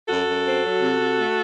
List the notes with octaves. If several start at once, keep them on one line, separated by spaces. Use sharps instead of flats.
F#2 F#4 A4
F#2
C4
F#3
C3
C3
A3